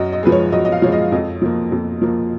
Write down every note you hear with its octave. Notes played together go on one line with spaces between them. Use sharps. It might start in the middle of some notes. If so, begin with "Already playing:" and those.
Already playing: F#2 D#5
D#5
F3 G#3 B4
C#5
F#2 D#5
D#5
F5
F3 G#3 C#5
D#5
F2 D#5
F3 A#3
F2
F3 A#3